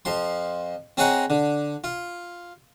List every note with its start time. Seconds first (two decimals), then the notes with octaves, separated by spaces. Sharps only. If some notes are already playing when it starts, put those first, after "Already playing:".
0.05 F2 F3 C6
0.97 C4 G#4 C#5 D#5 F#5 A#5
1.30 D3
1.84 F4